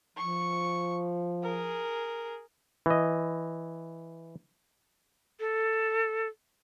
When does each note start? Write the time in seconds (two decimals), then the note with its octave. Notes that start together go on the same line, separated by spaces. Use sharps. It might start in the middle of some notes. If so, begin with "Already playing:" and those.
0.17 F3 C#6
1.43 G#4 A#4
2.86 E3 D#5
5.40 A4